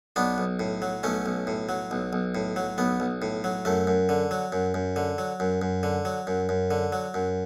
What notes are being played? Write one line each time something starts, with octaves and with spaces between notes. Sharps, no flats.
B1 B3 D4
B1
A2
F#3
B1 A3 C#4
B1
A2
F#3
B1
B1
A2
F#3
B1 B3
B1
A2
F#3
F#2 A3
F#2
D3
F#3
F#2
F#2
D3
F#3
F#2
F#2
D3
F#3
F#2
F#2
D3
F#3
F#2